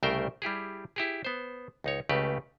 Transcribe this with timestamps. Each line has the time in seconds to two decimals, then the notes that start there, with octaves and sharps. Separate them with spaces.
0.03 C2 C#3 A3 A#4 C5 G5
0.42 G3 E4 G4 G#4
0.96 E4 G4 G#4
1.25 B3 C5
1.84 C#2 D#4 C#5
2.09 C#2 C#3 A3 G4 B4